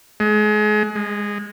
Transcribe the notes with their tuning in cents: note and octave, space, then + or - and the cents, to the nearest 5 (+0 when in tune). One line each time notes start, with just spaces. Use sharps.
G#3 +30
G#3 -15